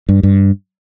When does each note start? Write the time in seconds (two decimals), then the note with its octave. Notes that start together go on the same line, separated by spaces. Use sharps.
0.09 G2
0.23 G2